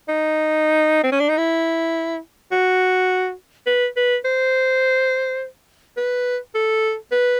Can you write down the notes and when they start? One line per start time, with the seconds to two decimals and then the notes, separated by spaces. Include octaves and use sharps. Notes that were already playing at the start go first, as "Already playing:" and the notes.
0.08 D#4
1.03 C4
1.12 C#4
1.20 D4
1.29 D#4
1.38 E4
2.52 F#4
3.66 B4
3.96 B4
4.25 C5
5.97 B4
6.55 A4
7.12 B4